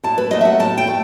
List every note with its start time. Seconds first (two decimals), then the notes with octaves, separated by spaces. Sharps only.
0.03 A2 A5
0.18 B4
0.31 F#3 A3 D#5
0.41 E5
0.45 F#5
0.59 A2 A5
0.78 G5
0.87 A3